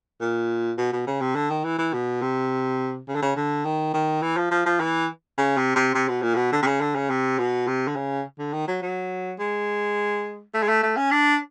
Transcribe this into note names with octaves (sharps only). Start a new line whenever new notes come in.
A#2
B2
B2
C#3
C3
D3
D#3
E3
E3
B2
C3
C#3
D3
C#3
D3
D#3
D#3
E3
F3
F3
F3
E3
C#3
C3
C3
C3
B2
A#2
B2
D3
C3
C#3
D3
C#3
C3
B2
C3
D3
C#3
D3
D#3
F#3
F#3
G#3
A3
G#3
A3
A3
C#4
D4